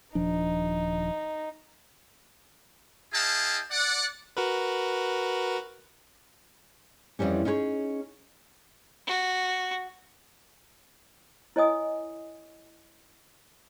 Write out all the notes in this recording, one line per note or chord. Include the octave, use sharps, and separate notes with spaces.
D#1 F3 D4 D#4
E4 G#4 D#5 F5 G5 A5
D5 F#5
F#4 A#4 B4
F2 G#2 E3 G3 C#4
C#4 D#4 G#4 B4 C#5
F#4
E4 C#5 D#5 G#5 D#6